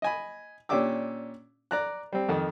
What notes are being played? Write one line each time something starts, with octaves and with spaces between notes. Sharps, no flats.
D#5 G#5 B5
A#2 C#4 D4 G4 D6 E6
D5 A#5 F#6
G3 C4
F2 D#3